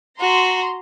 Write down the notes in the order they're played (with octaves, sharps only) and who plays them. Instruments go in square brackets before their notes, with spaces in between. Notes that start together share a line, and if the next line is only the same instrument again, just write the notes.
[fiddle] F#4 [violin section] A#5 C6